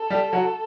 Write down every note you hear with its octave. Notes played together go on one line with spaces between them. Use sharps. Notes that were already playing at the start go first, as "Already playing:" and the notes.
Already playing: A4
G3 G4
F#3 F#4